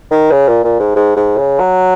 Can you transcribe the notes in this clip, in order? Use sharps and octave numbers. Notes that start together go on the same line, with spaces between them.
D#3
C#3
A#2
A#2
G#2
G#2
G#2
C#3
F#3